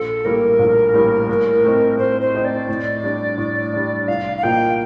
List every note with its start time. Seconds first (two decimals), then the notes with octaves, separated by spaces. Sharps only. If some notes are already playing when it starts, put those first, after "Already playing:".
Already playing: A#1 A4
0.25 A2 G3 A#3 A#4
0.59 A#1
0.94 A2 G3 A#3
1.29 A2
1.64 A3 C4 D#4
1.98 A2 C5
2.21 C5
2.34 A3 C4 D#4
2.45 D5
2.69 A2
3.03 G3 D4
3.38 A2
3.73 G3 D4
4.08 C2 F5
4.37 F5
4.43 A#2 F3 A#3 D#4 G5